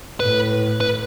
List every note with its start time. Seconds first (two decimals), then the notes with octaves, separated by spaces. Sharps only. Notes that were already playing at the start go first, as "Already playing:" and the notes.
0.20 A2 B4
0.81 B4